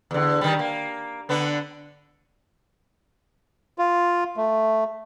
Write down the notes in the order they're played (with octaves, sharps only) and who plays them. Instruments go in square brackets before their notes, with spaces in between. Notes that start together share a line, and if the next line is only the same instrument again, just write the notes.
[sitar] E2 D3
D#3 G3
A#3
D3 B3 D4
[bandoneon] F4
A3